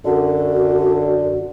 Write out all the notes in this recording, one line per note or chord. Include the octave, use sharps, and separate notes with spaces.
F#2 D3 F#4